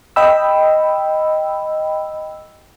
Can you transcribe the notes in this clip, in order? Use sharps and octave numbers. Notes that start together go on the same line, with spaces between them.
D#5 G5 B5 E6